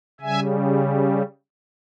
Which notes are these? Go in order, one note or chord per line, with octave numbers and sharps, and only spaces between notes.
C#3 G3 E5 G#5